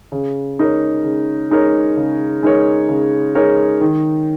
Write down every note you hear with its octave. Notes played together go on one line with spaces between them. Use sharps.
C#3
G#3 D#4 A#4 C#5
C#3
G#3 D#4 A#4 C#5
C#3
G#3 D#4 A#4 C#5
C#3
G#3 D#4 A#4 C#5
D#3